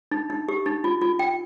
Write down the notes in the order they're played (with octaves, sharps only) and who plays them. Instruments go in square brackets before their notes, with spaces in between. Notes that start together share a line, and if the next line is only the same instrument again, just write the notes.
[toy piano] D#4
D#4
G4
D#4
F4
F4
G5